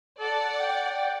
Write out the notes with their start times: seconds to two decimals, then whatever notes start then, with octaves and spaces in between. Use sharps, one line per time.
0.19 A4 D5 F#5
0.60 G5